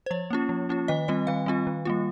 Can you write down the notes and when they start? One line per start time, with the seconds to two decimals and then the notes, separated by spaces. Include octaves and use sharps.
0.06 C5
0.11 F3 C#5
0.30 A#3 C#4 F4
0.49 F3
0.69 A#3 C#4 F4
0.88 D#3 D#5
1.08 G3 C4 F4 D#5
1.27 D#3 F5
1.46 G3 C4 F4
1.67 D#3
1.85 G3 A#3 F4